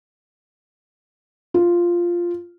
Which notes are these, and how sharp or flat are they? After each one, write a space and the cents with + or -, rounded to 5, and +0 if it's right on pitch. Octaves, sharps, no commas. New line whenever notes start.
F4 -5